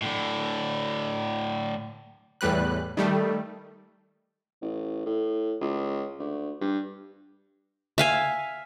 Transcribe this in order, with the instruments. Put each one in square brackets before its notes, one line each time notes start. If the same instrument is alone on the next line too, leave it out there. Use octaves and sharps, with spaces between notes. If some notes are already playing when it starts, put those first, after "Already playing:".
[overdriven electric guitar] A2 D3
[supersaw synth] E2 A2 G3 B4 F#6
D#3 G3 A3
[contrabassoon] A1
A2
C#2
D2
G2
[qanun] E5 F5 G#5